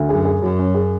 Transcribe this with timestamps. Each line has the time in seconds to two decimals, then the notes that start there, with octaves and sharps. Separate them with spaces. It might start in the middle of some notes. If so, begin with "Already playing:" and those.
Already playing: D2
0.09 F#2 G#4
0.25 G#4
0.42 F#2 F#3
0.59 C#4
0.74 G#4